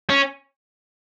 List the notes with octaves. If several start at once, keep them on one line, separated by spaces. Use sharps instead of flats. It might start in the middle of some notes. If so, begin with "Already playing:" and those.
C#4